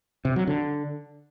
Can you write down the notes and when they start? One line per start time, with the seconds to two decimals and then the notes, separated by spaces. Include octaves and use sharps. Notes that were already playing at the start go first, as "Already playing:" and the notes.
0.25 C3
0.36 F#3
0.47 D3